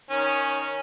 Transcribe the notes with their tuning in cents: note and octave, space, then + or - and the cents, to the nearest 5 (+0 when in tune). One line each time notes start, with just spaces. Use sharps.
D#3 +0 C#4 +0